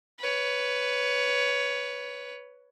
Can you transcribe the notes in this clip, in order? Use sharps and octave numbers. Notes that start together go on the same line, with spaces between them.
B4 C#5